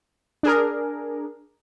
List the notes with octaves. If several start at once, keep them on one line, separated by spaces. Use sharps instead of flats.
D4 G#4 A#4